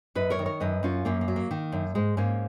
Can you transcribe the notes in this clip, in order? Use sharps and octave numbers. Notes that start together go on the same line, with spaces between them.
F#2 B4 D#5
A#4 C#5
D#3
A#4 C#5
F#2 B4 D#5
F#2 C#4 F4
F#2 A#3 C#4
A#3
F#3
A#3
D#3
F#2
G#2 G#3
G#2 A#3 C#4